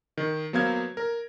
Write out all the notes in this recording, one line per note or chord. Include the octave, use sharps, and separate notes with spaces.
D#3
F#3 A#3 B3 C5 F5 G#6
A#4